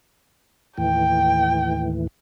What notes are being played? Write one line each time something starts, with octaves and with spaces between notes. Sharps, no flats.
D#2 A2 E3 G5